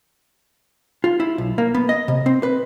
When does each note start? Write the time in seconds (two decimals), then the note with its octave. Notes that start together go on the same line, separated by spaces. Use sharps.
1.04 F4
1.20 E4
1.38 B1
1.58 A#3
1.75 B3
1.89 D#5
2.08 C3
2.26 C4
2.43 B4